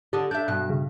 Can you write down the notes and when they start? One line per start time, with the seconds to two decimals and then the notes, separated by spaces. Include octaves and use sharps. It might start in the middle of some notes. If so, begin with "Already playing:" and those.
0.13 D3 D4 G4 D#5
0.31 D4 E5 G6
0.48 G2 B2 F#6
0.70 C#3